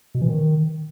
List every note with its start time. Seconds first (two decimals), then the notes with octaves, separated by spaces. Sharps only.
0.15 B2
0.22 E3
0.29 D#3